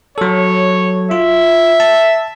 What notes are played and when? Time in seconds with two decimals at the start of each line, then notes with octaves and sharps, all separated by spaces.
0.18 F#3 A4 C#5
1.11 F4 E5
1.80 A5